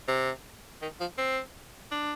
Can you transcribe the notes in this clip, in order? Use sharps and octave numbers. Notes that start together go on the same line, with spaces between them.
C3
D#3
F3
C4
D4